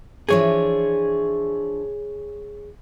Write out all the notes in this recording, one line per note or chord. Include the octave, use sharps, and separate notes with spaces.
E3 F3 D4 G#4 C#5